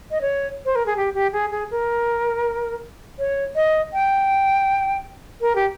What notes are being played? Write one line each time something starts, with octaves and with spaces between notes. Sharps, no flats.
D#5
C#5
C5
A#4
G#4
G4
G4
G#4
G#4
A#4
C#5
D#5
G5
A#4
G4